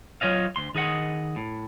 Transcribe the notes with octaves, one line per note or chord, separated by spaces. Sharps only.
F#3 F4 C#5 D#5 F5
D2 C6
D#3 G#4 D#5 F#5
A2